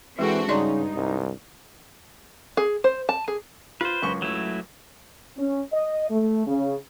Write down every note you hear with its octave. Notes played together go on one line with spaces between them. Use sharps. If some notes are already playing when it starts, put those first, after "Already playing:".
E3 G#3 C4 D4 F#4 G#4 A4
G2 C#3 D#4 D5 D#5 C6
C2
G#4
C5
A5
G#4
F4 B4 C5
C#2 F#2 C#6
F#3 A3 E4
C#4
D#5
A3
C#3